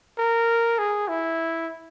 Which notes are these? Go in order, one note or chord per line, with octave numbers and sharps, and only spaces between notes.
A#4
G#4
E4